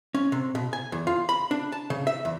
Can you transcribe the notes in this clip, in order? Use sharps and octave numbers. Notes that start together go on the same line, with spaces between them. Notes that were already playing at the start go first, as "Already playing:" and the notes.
C#4
C3
B2
G#5
E2
F4
B5
D4
A5
C#3
E5
E2